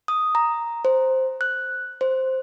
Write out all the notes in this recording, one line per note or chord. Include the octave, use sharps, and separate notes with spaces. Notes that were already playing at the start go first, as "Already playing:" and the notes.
D#6
A#5
C5
F#6
C5